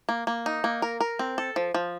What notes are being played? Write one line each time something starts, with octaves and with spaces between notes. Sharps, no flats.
A#3
A#3
D#4
A#3
A#4
A#4
C4
A4
F3
F3